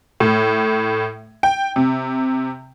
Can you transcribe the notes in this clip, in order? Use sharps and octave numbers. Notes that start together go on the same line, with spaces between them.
A2
G5
C3